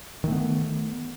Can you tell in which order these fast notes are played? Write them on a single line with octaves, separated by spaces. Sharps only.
D#3 A3 B3